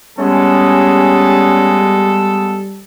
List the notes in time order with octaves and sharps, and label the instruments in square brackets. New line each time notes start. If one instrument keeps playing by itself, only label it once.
[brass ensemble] G3 [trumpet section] G#3 B3 [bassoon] C#4 [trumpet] A4